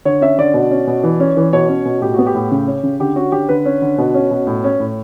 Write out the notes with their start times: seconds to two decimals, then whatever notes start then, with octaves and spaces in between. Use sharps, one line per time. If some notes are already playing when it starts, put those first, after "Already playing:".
0.05 D3 C#5
0.21 C#4 E5
0.38 D3 D5
0.54 B2
0.71 C#4
0.87 B2
1.04 E3
1.20 C#4
1.37 E3
1.53 B2 C#5
1.69 C#4
1.85 B2
2.01 A2 G4
2.14 B3 F#4
2.26 G4
2.35 A2
2.51 C#3
2.67 C#4
2.83 C#3
3.00 D3 G4
3.16 C#4 F#4
3.32 D3 G4
3.49 D3 B4
3.65 C#4
3.82 D3
3.98 B2
4.14 C#4
4.31 B2
4.47 A2
4.64 C#4
4.80 A2